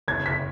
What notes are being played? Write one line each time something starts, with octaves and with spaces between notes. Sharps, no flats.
F#1 G#6
B6